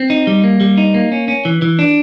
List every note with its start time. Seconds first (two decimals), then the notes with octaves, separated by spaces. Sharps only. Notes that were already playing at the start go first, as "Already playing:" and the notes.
Already playing: C4
0.10 D#4
0.27 G3
0.44 A#3
0.60 G3
0.77 D#4
0.94 A#3
1.12 C#4
1.28 C#4
1.45 E3
1.62 E3
1.79 D4